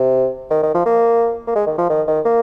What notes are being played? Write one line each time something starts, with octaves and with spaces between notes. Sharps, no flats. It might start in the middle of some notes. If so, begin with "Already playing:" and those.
Already playing: C3
D#3
D#3
F3
A#3
A#3
G#3
D#3
F3
D#3
D#3
A#3